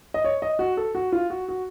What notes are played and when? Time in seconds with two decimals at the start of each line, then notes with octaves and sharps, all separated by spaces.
0.14 D#5
0.24 C#5
0.42 D#5
0.59 F#4
0.77 A4
0.95 F#4
1.12 F4
1.30 F#4
1.48 F#4